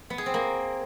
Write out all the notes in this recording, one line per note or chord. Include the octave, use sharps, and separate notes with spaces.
B3
G#4
C4
A#3